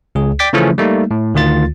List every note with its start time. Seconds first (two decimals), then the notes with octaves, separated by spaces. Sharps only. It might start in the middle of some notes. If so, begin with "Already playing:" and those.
0.15 C#2 G#4
0.39 D5 G5 D6 G6 A6 B6
0.53 C#3 E3 F3 A3 C#4
0.78 G3 A3 A#3 D#4
1.11 A2
1.35 D2 D#3 F4 A6